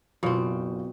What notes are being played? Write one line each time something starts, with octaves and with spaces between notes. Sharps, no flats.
F#1 B2 C4 F4